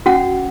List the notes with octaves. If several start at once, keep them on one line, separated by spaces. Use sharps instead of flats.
C#4 F#4 F#5